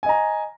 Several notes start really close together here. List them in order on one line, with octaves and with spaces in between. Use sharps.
G#5 D#5 A#5